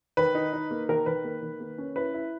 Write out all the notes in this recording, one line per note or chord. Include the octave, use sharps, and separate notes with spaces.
D#3 B4
D#4
D#4
A#3
D#3 A#4
D#3 B4
A#3
D#3
A#3
C#4
E4 B4
E4